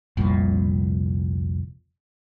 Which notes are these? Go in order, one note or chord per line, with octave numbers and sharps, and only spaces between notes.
F1 C2 A#2